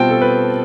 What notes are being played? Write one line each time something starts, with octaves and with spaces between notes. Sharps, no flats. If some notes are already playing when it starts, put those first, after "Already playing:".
Already playing: B2 G3 C4 F4 G5 A5
A4
B4